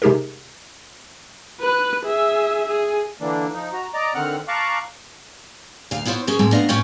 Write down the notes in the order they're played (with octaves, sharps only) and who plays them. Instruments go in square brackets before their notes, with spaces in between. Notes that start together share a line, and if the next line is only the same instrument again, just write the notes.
[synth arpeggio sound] C3 G#3 D#4 G4 G#4 A#4
[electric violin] B4 F#6
G#4 E5
G#4
[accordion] D3 E3 A#3 D4
F3 D#4
F#4 A#5
D5 D#5 A#5 D6
D3 D#3 C4 F#5 F6 F#6
F5 A5 A#5 C#6 D6 F#6
[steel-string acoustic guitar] D2 F5
B3 E4 F4 C5 C#5
C#4 G#4 A#4 C5
A2 G#3 A#3 C4
A3 B3 D4 D#5 F5
A2 C#4 F4 C#5 G5